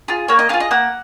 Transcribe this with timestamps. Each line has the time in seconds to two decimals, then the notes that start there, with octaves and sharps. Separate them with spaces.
0.08 F4 G#4
0.28 A#3 C#5
0.39 D#5
0.49 F4 G#4 F5
0.60 D#5
0.71 A#3 F#5